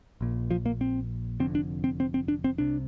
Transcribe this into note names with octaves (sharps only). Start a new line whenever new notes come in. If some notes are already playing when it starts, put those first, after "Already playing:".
A#1 A#2
F3
A#3
C4
F1 F2 D3 C4
D4
C4
C4
C4
D4
C4
C2 C3 D4